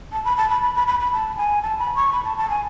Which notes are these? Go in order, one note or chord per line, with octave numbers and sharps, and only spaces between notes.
A5
B5
A5
B5
B5
B5
B5
B5
A5
G#5
A5
B5
C#6
B5
A5
A5
G#5